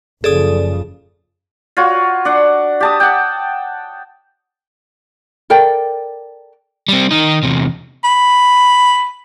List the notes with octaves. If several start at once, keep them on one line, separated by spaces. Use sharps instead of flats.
F#1 C#3 F3 G#4 A4 D5 D#6
F4 F#4 C#5
D4 F#5
G4 A5 D#6
F#5 G5
A4 A#4 D5 G5
G3 C4
D#3 D#4
E2 C3
B5